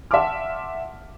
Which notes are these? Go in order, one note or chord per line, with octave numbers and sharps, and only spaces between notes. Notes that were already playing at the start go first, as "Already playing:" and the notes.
E5 F#5 A5 C6 D6 F6